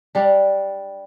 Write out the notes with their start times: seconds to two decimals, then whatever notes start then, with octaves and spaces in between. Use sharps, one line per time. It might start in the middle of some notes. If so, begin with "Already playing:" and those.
0.15 G3 D4